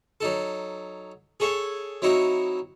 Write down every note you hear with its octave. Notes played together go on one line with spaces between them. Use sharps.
F#3 D#4 A4
G#4 A4 C#5 E5
F#3 C4 D#4 E4 F#4 D#5